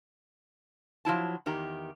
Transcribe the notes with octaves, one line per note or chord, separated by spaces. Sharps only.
F3 F#3 E4 A5
E2 D#3 G4 A#5